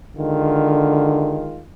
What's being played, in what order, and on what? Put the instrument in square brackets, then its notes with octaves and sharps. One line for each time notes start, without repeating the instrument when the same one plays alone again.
[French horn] D3 [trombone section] D#3 G#3 F4